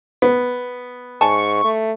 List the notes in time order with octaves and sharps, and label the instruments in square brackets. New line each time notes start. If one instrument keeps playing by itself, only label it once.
[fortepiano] B3
[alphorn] G#2 [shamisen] D5 G#5 A5 [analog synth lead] C#6
[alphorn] A3